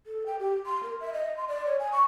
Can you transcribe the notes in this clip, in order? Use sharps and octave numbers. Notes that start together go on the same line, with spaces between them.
A4
G5
G4
C6
A#4
E5
D#5
C6
D5
C#5
G#5
C#6